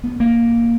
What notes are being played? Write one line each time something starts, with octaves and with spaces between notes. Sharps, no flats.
B3
A#3